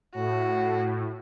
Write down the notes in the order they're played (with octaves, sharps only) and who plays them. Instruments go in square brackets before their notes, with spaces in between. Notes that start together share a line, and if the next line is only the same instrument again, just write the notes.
[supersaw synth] A2 [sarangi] F#4